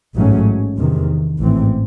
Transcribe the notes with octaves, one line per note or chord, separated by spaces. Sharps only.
A1 G#2 F#3 A3 C#4
E2 C3 D#3
A1 G#2 E3 C4